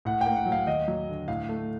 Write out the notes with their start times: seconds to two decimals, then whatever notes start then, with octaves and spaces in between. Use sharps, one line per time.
0.05 A2 F#5
0.21 A#3 G5
0.36 F#5
0.46 F#3
0.52 F5
0.66 D#2 D#5
0.88 F#3
1.08 D3
1.28 A2 F5
1.49 A3